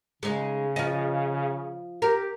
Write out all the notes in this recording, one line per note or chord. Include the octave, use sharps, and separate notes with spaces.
C#3 G#3 D#4
F3 D#5
G4 A#4